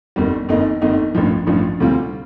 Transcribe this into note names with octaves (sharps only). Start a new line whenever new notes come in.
G1 F2 D#3 G3
G1 F2 D#3 A#3 D#4
G1 F2 D#3 A#3 D#4
A1 G2 F3
A1 G2 F3
D2 C3 G3 C4 F4